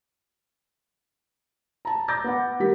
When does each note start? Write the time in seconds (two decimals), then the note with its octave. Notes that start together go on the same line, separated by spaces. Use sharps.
1.85 A5 A#5
2.08 D5 A#5 D6 G6 A6 A#6
2.24 B3 F#5
2.60 G3 G4 A#4 B6